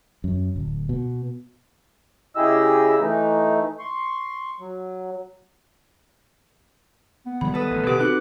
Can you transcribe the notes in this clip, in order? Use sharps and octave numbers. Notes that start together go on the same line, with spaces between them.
F#2
D1
B2
C#3 E4 G4 G#4 D#5 E6
E3 A3 D#4
C6 C#6
F#3
B3
D#3 G3 G#3 B5
A4 B4 D#6
A1
B2 D#3 G4 B4 F#5 D6
C4 D#4 F#4 F#6